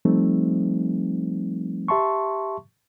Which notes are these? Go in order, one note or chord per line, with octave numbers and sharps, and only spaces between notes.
F3 G3 A3 C4 D#4
G4 E5 A5 C6 C#6